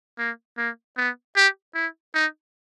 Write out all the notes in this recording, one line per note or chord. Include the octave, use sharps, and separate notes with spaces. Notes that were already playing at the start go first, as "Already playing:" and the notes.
A#3
A#3
B3
G4
E4
D#4